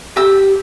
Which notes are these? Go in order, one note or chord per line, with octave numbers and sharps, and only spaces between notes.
G4 E6